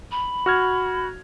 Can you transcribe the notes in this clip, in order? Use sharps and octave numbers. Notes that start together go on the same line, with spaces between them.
B5
F#4 F6 G#6